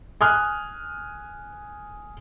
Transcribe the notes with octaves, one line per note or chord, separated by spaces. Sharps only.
G#5 D#6 F6 F#6